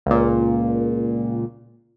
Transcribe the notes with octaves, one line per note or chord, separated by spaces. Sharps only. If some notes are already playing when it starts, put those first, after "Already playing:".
C#2 A#2